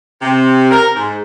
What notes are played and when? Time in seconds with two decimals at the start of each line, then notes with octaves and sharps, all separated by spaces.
0.22 C3
0.71 A#4
0.96 G#2